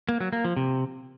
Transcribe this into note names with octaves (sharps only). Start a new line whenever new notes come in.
A#3
F#3
A#3
F3
C3